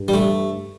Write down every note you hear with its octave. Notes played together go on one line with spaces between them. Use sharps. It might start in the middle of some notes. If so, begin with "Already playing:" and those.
Already playing: G2
G3
A3